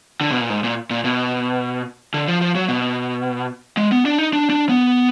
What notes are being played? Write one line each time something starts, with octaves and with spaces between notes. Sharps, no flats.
D3
B2
A#2
G#2
A#2
A#2
B2
D3
F3
F3
F#3
B2
G#3
B3
D4
D#4
D4
D4
B3